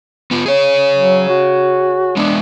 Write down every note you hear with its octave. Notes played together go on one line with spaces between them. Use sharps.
B3 F4
G#4 C#5
F#3
F#4
G#3 B3 D4